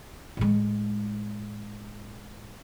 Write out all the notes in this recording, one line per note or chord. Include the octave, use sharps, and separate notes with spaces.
A2 G#3